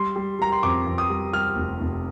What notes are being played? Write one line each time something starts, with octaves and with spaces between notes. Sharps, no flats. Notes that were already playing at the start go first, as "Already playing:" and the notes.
Already playing: G3 C6
G3
G3 A#5
C6
F2 D6
F2
D#6
G3
G3 F6
F1
F1